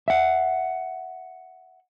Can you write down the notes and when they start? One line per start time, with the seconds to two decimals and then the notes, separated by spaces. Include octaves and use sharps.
0.08 E5 F#5